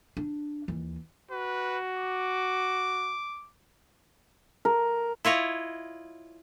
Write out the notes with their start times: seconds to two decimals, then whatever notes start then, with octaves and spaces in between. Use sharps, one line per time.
0.17 D4
0.68 D#2 E3
1.31 F#4 B4
1.97 D6
4.65 A#4
5.25 E4 F4 C#5 D#5